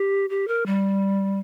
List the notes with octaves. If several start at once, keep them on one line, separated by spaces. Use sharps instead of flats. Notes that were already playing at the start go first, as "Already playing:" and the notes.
Already playing: G4
G4
A#4
G3